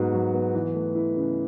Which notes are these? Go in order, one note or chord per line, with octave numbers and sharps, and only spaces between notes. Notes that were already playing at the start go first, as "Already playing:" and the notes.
Already playing: G#2 F#3 B3 F#4
F#3
B3
E3
A3
E4
C#3